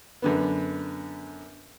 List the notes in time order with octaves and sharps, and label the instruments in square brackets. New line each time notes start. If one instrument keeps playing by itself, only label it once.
[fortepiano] F#2 D3 B3